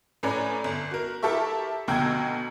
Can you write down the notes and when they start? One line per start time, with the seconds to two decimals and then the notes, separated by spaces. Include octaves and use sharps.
0.23 A2 C#4 B4 D5 G#5 A#5
0.64 G1
0.91 F#4 A#4
1.23 E4 G4 A4 A#4 E5 C#6
1.88 D2 B2 G5 A#5 E6 G#6